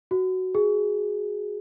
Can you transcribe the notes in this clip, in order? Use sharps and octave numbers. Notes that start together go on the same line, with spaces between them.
F#4
G#4